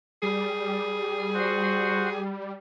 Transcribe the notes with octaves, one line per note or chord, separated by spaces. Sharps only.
G3 G#4
F#4 C5 F#5